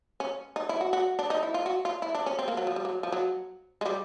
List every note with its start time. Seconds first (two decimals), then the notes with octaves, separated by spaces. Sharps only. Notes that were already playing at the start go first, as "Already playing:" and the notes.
0.20 C#4
0.56 D#4
0.69 E4
0.81 F#4
0.93 F#4
1.19 D4
1.30 D#4
1.43 E4
1.54 F4
1.66 F#4
1.85 F4
2.02 E4
2.15 D4
2.26 C#4
2.39 C4
2.48 A#3
2.57 F#3
2.67 F3
2.76 G3
2.85 F#3
3.03 F3
3.12 F#3
3.81 G#3
3.86 G3